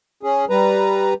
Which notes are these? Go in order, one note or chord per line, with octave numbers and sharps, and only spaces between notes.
C#4 G#4
G3 B4 A#5